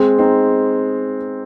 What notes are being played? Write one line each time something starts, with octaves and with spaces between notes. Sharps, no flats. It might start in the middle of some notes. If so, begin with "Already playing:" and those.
Already playing: G#3 C4
C4 D#4